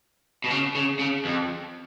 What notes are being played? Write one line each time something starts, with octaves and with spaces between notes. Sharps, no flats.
B2
C#3
C#3
C#3
F2